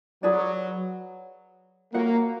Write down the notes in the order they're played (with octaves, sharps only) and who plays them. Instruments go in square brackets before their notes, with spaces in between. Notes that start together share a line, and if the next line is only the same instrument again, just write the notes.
[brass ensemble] F#3 [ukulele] G#4 B4 D5
[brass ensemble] A#3 [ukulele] F#4 A#4 C#5 F#5